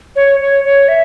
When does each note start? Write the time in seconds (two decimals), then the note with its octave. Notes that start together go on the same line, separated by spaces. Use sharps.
0.16 C#5
0.40 C#5
0.64 C#5
0.88 E5